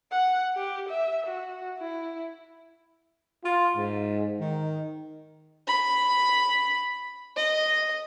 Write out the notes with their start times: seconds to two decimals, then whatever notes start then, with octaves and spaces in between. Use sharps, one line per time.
0.12 F#5
0.56 G4
0.89 E5
1.26 F#4
1.79 E4
3.44 F4
3.76 G#2
4.40 D#3
5.68 B5
7.36 D#5